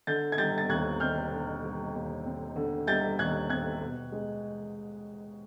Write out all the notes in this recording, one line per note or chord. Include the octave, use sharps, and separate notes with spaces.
D3 G6 A6
G#6
G3 G6 A6
A6
D#2 F#6 G#6
C4 F6 G6
D3
G3
D#2
C4
D3
G3 G6 A6
D#2 F#6 G#6
C4 F#6 G#6
B2
G#3